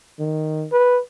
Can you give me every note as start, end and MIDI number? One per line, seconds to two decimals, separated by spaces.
0.19 0.66 51
0.72 1.00 71